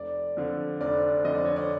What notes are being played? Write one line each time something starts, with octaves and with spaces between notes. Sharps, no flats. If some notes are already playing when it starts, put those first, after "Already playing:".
Already playing: F1 D5
F2 D3
F1 D5
F2 D3 D#5
D5
C#5
D5